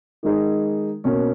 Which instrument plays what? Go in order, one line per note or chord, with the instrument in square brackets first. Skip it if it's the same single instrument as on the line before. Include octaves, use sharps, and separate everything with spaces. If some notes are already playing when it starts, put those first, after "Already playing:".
[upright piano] D#3 G#3 D#4 G#4
B2 A#3 C#4